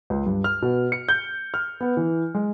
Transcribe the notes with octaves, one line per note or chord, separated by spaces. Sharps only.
C#2
G2
F6
B2
C#7
G6
F6
B3
E3
G#3